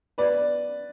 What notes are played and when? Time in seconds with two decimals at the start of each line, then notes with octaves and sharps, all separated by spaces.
0.18 B3 B4 D5